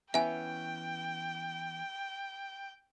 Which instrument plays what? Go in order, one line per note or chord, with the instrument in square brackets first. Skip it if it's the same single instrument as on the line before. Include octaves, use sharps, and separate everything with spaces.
[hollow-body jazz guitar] E3 B3 C#4 [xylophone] E5 G#5 [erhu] G5